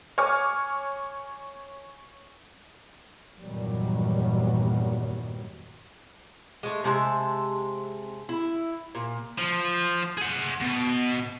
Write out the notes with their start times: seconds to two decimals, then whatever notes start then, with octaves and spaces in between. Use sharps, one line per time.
0.18 C#5 G#5 D6 F6
3.41 E2 G2 A#2 D#3 F#3 G3
6.63 G#3 A3
6.84 C3 G#3 E5 A5
8.29 E4
8.95 A#2
9.38 F3
10.18 G#4 F#5
10.61 B2